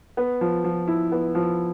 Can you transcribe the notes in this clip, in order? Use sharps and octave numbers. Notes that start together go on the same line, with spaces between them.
B3
F3
F3
E4
B3
F3